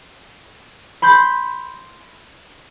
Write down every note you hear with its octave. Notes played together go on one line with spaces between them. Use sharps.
B5 C6 G6